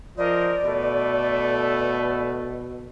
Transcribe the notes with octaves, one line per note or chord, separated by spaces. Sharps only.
F3 A#4 C5 D5 D#5
B2 A3 A4 B4